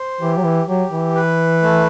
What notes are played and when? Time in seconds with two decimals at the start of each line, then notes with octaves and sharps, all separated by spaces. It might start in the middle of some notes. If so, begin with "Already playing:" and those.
Already playing: C5
0.21 E3 G4
0.38 F#3
0.45 E3
0.68 F#3 G4
0.91 E3
1.15 B4
1.62 A3